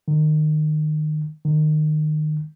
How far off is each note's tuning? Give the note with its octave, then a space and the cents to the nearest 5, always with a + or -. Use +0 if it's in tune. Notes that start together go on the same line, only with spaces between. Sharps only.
D#3 -25
D#3 -25